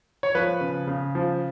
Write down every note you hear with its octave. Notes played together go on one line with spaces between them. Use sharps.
C#5
F3 B4
C#3
C#3
F3